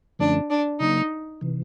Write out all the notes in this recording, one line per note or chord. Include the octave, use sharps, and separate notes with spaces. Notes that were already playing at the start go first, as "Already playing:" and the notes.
F#2 D3 F3 A3 C#4 D4
D4
C#3 F#3 A#3 D#4
C3 E3